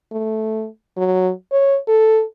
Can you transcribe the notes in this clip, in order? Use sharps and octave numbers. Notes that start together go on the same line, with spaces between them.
A3
F#3
C#5
A4